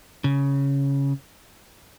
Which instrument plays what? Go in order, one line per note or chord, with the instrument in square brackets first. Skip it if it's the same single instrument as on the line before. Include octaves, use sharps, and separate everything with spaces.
[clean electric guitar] C#3